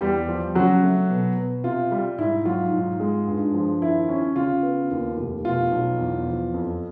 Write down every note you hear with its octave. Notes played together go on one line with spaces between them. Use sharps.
E2 G3 G4
F3
C#3 F#3 F#4
A3
B2
B3
C3 F4
G3
G#2 E4
F#3 F4
G#2
G#3
G2
F3
D#3 E4
C#4
C#3 F4
B3
D#2
F1
B2 F4
B1
E2
F3
F2